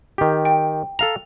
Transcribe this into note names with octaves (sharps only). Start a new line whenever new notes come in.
D#3 G4
G5
A4 F5 A#5 F7